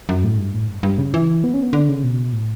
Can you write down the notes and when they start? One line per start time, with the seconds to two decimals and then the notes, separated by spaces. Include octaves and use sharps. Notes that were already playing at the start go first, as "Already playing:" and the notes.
0.09 F#2
0.24 A2
0.38 G2
0.54 A2
0.68 G2
0.83 G2
0.98 C#3
1.14 E3
1.44 B3
1.54 C#4
1.63 B3
1.73 D3
1.89 C#3
2.04 B2
2.33 A2